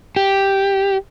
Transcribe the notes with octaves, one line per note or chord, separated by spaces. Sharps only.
G4